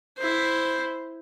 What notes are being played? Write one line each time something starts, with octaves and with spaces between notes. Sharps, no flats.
E4 C5